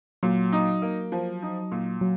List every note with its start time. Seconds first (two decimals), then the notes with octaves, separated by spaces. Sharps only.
0.23 A#2 F#3
0.52 D#4
0.82 A#3
1.12 F3
1.42 D#4
1.72 A#2
2.01 F#3